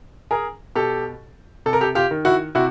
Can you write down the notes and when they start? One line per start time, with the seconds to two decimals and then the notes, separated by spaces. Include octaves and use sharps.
0.31 G#4 A#4
0.75 B2 G4 A4
1.66 C3 A4
1.73 A#4
1.81 G4 A4
1.95 F4 G4
2.11 D#3
2.25 E4 F#4
2.55 C3 E4 F#4